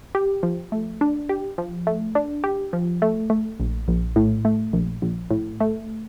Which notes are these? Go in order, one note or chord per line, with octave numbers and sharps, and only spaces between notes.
G4
F3
A3
D4
G4
F3
A3
D4
G4
F3
A3
A3
A#1
A#1
A2
A3
A#1
A#1
A2
A3